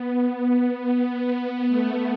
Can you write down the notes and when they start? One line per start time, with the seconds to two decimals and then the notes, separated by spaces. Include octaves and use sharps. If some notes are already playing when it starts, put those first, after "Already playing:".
Already playing: B3
0.17 B3
0.55 B3
1.30 B3
1.68 A3